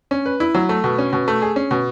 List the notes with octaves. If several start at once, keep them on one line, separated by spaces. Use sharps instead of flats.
C#4
B4
E4
F#3
A3
B2
C#4
B2
A3
G#4
C#4
B2